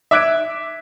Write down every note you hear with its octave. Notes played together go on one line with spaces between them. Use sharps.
E5 D6 F#6 G#6 D7